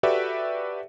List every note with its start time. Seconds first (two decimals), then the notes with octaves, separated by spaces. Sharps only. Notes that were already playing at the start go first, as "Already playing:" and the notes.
0.03 F#4 G4 A4 B4 D5 E5